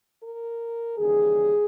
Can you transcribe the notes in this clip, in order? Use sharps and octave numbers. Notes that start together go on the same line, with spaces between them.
A#4
D#2 C#3 E3 G3 G#4